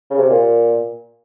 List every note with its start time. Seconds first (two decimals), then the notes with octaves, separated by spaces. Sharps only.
0.10 C#3
0.18 C3
0.30 A#2